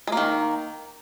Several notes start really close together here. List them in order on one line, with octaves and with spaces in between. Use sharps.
G#3 A#3 D#3